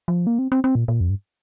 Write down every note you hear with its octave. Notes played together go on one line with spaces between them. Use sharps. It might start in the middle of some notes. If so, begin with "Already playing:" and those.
F3
A#3
C4
C4
C4
A#2
A#2
F2
G2